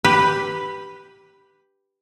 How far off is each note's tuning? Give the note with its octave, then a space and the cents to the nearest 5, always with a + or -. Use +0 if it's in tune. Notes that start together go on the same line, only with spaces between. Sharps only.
G4 +0 B4 +0